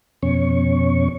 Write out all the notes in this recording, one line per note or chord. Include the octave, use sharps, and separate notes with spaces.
F2 B2 C#4 C#6